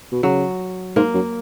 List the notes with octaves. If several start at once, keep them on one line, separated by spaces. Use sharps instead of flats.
B2
C#3 F#3
G#2 A#3
F#2